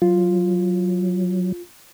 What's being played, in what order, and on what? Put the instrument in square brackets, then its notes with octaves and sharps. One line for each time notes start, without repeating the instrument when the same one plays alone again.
[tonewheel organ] F#3 [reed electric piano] F4